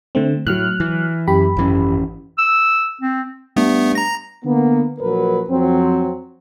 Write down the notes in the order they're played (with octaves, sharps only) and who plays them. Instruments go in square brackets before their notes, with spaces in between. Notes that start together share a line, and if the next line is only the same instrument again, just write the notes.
[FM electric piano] D3 A3 C4
[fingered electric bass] A2 [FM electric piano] F#3 F6 F#6
[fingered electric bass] E3
[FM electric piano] F#2 G4 B5
[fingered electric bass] G#1 E3 C#4
[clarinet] E6
C4
[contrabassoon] G2 [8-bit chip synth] A3 B3
[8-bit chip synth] A#5 A#6
[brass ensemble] D3 A#3 B3
A#1 F#3 A#4 B4
F2 F#3 C4